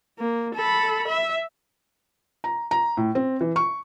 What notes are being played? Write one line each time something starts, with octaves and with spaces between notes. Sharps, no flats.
A#3
A4 B5
E5
A#5
A#5
A2
C4
E3
C#6